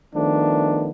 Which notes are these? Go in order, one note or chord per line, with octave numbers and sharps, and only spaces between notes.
D#3 F3 A3 B3 D4